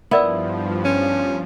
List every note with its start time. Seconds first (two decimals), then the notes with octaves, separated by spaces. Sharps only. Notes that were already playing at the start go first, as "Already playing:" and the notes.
0.11 G2 F3 B3 E4 A#4 D5 E6
0.85 C#4